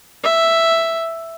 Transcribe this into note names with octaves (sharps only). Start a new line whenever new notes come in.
E5